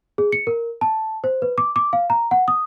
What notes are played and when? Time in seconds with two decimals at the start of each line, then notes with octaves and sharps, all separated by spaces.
0.18 G#4
0.32 C#7
0.47 A#4
0.81 A5
1.24 C5
1.42 B4
1.58 D6
1.76 D6
1.93 F5
2.10 A#5
2.31 F#5
2.48 D#6